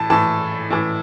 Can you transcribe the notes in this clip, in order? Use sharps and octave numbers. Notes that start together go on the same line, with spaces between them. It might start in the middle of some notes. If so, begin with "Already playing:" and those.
Already playing: A2 E3 A5
A2 E3 A5
A2 E3